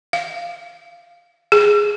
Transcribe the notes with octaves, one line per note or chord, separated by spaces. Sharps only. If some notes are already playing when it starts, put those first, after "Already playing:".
F5
G#4